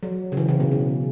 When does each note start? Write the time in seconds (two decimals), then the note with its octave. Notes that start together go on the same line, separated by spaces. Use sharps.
0.03 F#3
0.32 C#3
0.37 E3
0.49 C#3
0.60 B2
0.71 C#3